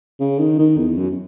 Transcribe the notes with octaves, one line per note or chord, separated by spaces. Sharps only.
C#3
D#3
D#3
E2
F#2